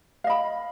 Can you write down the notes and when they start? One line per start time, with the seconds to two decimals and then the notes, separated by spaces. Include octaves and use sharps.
0.24 F5
0.27 D#5
0.30 B5